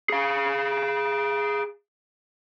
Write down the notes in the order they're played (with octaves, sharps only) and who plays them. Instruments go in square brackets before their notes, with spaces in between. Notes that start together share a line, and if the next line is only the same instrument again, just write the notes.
[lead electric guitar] G#4 F5